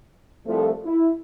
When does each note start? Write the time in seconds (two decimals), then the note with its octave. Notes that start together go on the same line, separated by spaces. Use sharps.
0.46 C2 F3 A3
0.85 E4